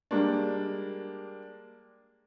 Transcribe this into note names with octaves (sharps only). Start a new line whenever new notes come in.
G3 G#3 A#3 D4